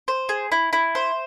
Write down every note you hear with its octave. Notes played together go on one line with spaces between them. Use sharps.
C5
G#4
E4
E4
C5